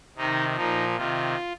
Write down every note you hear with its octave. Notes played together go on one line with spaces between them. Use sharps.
C3 D#3 D#4
A#2 F3 D#4
C3 D#3 F4